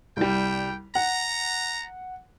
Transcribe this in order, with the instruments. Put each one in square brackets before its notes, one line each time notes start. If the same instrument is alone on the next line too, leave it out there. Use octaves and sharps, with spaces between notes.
[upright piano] C2 G3 [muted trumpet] G5
[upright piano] F#5 [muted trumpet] A#5